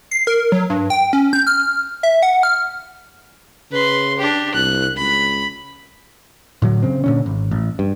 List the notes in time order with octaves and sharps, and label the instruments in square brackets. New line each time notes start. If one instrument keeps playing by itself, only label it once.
[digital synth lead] C7
A#4
F#3
G2
G5
C#4
G6
F6
E5
F#5
F6
[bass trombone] C#3 [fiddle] B4 C6
[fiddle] D4 G4
[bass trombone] C2 [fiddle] F#6
[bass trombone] C#2 [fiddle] B5
[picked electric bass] A2 D3 F#3
C#3 C4
A#2 D3 C#4
G#1
A1
G2